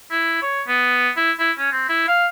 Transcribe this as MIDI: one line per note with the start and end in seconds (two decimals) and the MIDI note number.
0.11 0.37 64
0.42 0.62 73
0.68 1.10 59
1.17 1.32 64
1.39 1.51 64
1.58 1.71 61
1.72 1.86 60
1.89 2.04 64
2.08 2.27 77